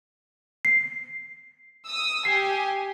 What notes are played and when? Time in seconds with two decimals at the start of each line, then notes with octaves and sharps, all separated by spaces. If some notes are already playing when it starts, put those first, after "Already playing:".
0.65 C7
1.86 D#6 E6
2.25 G4 G#5 C7